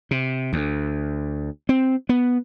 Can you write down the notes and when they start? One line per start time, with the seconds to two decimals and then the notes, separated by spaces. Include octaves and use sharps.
0.11 C3
0.53 D2
1.69 C4
2.09 B3